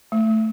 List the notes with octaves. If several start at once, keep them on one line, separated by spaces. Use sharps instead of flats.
A3